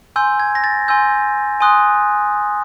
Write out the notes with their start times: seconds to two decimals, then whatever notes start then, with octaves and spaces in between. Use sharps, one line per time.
0.16 G#5 C6 E6 G6
0.40 G#6
0.55 A#6
0.64 A6
0.88 G#5 C6 E6 G6
1.60 G#5 C6 D#6 F#6